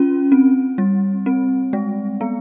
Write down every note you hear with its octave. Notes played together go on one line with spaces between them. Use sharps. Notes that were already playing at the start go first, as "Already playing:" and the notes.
Already playing: C#4 F4
C4
G3
C4
G#3
B3